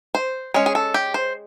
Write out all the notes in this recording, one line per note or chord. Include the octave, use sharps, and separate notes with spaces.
C5
G#3 C#4 C#5
G#4
A4
G4
C5